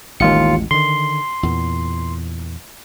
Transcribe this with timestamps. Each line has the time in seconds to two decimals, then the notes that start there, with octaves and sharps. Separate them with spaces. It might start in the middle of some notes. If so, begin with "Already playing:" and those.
0.20 A1 D#2 G#3 F4 C#7
0.71 D3 D#3 C6
1.43 E2 A#2